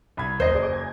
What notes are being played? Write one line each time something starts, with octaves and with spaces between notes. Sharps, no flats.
C2 B5 G#6
F#1 D#2 C5 D#5 A#6
G#4 D5
G#5